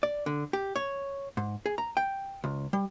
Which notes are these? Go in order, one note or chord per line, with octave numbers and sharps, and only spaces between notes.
D5
D3
G4
C#5
G#2
G#4
A#5
G5
C#2
G3